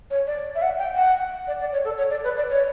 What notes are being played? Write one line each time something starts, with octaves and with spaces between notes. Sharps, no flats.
C#5
D5
E5
F#5
G5
F#5
D5
D5
C#5
A4
C#5
D5
B4
D5
C#5